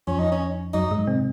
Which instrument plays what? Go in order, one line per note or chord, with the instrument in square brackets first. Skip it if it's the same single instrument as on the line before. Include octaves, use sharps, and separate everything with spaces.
[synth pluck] F2 F3 [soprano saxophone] C#4
[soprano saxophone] D#4
C#4
[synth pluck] F#2 F#3 [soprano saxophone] D#4
[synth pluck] G#2 G#3
C3 C4